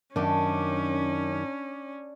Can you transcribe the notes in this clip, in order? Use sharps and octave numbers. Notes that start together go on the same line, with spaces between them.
F#2 D#3 C#4 D4